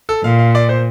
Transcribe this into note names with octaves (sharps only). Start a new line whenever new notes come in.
A4
A#2 F5
F5
D5
C5